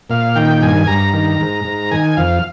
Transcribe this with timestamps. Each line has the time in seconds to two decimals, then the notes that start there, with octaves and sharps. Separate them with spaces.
0.10 A#2 F5
0.36 D#3 G5
0.62 G2 G#5
0.87 G2 A#5
1.13 D#3
1.40 G#2
1.65 G#2
1.91 D#3 G#5
2.17 F2 F5